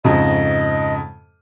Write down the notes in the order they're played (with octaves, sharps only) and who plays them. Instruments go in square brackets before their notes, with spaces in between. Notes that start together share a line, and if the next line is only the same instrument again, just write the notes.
[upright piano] F2 G#2 C#3 [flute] D#5